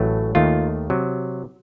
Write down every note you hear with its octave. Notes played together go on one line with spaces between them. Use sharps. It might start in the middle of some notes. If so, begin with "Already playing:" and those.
Already playing: A1 A2 F#3 A3
D#2 D#3 A3 F4
C3 F#3